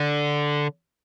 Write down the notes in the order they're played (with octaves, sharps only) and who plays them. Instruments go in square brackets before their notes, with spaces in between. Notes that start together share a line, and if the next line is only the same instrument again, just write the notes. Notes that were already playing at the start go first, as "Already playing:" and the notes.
Already playing: [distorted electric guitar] D3